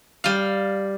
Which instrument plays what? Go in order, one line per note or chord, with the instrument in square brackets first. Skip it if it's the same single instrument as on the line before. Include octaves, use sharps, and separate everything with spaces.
[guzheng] G3 F5